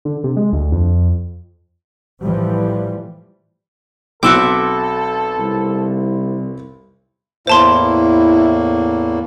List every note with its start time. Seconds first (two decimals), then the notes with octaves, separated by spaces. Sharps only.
0.05 D3
0.24 C3
0.37 G#3
0.53 D2
0.72 F2
2.24 A2 E3 F3 G3
4.23 B1 C4 F#4 A4 E5 D6 E6
5.39 C2
7.47 E2 A2 A#3 E4 C5 A5 C6